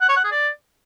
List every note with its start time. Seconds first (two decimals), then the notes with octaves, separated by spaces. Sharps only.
0.01 F#5
0.08 C#5
0.16 F#5
0.24 G#4
0.31 D5